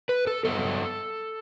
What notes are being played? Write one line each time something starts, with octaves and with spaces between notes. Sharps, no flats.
B4
A4
G2 F#3 B3 A4